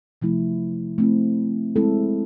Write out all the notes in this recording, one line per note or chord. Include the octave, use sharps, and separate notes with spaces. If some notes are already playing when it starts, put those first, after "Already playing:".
C3 F3 A3 E4
A3 C4 E4
G#3 C4 E4 A4